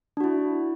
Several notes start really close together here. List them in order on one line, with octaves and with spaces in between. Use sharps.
D4 F#4 E4